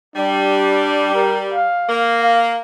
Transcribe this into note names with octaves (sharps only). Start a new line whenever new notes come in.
G3 D4
A#4
F5
A#3
F5